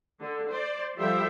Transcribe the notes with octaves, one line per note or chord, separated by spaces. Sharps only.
D3
C5 D5
F3 G3 A4 C5 E5 G5